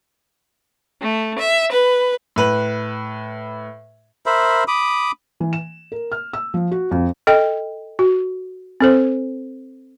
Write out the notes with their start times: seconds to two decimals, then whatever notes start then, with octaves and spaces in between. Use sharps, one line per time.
1.01 A3
1.38 E5
1.72 B4
2.36 A2 B4 F#7
4.26 A#4 C5 E5 B5
4.68 B5 D6 D#6
5.40 E3
5.53 E7
5.92 A#4
6.12 F6
6.33 E6
6.54 F3
6.71 F#4
6.91 F2
7.27 A4 D#5 G5
7.99 F#4
8.81 C4 A4 C5